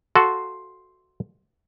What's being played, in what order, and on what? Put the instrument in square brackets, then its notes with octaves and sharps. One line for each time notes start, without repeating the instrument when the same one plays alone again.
[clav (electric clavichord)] F#4 A4 [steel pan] C6